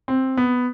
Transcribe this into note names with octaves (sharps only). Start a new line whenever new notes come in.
C4
B3